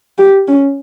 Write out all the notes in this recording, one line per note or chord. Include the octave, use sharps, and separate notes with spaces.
G4
C#4